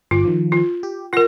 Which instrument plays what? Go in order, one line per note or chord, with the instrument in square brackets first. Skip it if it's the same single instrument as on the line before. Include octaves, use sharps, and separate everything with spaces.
[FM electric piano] G1 D6 [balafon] F4
[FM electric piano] D#3 F3
[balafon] F4
[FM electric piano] G4
[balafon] F4 A#4 [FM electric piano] F#5 A#6